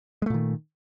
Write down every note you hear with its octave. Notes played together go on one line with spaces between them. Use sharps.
A#2 D#3 G#3 A3